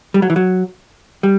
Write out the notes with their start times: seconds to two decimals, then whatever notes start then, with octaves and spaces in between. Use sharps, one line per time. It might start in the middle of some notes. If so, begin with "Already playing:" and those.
0.14 G3
0.22 F#3
0.30 E3
0.36 F#3
1.23 G3